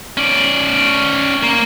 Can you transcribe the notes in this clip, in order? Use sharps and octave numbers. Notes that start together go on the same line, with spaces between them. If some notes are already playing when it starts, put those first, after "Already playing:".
C#4 D5
A#3